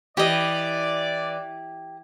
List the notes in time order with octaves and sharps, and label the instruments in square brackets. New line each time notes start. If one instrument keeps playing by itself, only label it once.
[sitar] E3 [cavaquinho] G4 D#5 [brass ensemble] D5